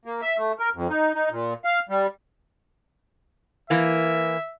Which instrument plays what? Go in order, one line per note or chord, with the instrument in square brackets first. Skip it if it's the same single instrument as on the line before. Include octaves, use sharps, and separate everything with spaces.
[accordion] A#3
E5
A3
A#4
F2
D#4
D#4
A#2
F5
G3
[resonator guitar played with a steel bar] E3 A#3 [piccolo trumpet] E5